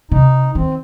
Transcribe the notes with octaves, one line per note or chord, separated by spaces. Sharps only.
C3 D#4
D#3 C4